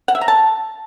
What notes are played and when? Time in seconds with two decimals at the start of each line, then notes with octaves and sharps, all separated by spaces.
0.08 F#5
0.15 E5
0.21 A#5
0.28 A5